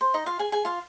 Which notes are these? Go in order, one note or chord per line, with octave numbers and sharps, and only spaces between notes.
C5
D#4 D#5
F4 F5
G#4 G#5
G#4 G#5
F4 F5